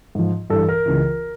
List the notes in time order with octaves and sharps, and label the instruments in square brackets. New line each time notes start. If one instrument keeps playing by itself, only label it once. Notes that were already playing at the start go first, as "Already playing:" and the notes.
[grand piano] G#2 F3
G2 E3 A4
A#4
C#2 C#3 E3